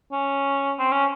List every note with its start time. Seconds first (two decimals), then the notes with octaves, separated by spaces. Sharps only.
0.12 C#4
0.79 C4
0.92 C#4